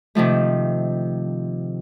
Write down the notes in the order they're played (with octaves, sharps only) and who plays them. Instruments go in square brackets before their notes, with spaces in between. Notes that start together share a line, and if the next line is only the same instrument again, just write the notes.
[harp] C3 D#3 F3 A3